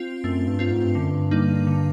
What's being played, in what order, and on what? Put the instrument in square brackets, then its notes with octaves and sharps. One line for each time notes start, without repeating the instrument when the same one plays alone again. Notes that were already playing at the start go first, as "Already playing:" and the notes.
Already playing: [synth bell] C4 F4
[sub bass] F#2 [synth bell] A3
[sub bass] G2
[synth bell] C4 F4
[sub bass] G#2
G2
[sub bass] F#2 [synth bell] D3
[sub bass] G2
[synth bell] G3 A#3 D#4
D3